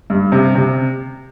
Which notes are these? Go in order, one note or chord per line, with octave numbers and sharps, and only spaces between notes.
G2
C3
C3